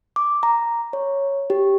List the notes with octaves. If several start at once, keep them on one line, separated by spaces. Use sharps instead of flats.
D6
A#5
C#5
G4